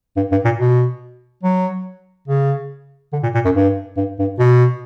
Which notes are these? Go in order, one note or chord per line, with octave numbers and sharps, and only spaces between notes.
G2
G2
A#2
B2
F#3
C#3
D3
A#2
A#2
F#2
G2
G2
G2
B2